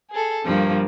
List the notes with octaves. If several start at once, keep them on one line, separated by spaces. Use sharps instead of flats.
G#4 A4
G2 F3 A#3